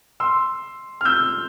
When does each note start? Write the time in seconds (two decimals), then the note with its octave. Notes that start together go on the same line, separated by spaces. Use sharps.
0.20 C6 E6
1.01 F6
1.05 E6 G6